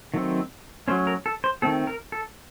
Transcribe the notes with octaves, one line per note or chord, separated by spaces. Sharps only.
D#3 F#3 A3 C4
F#3 A3 C#4 C5
A#4
A4
C5
D#3 A3 C4 A4
A#4
A4